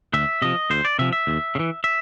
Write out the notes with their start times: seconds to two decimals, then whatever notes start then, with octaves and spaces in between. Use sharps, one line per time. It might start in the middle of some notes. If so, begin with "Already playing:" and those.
0.14 D2 E5
0.42 C3 F3 D#5
0.70 D2 C5
0.85 D5
0.99 C3 F3 E5
1.13 E5
1.27 D#2
1.55 C#3
1.59 E3
1.84 E5